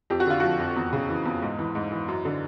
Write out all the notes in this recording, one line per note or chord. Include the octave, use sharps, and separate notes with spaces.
F2 G4
F#4
D3 F4
F3 F#4
F2
E2
C#3
E3
E2
G#2
E3
G#2
E3
F#2
D3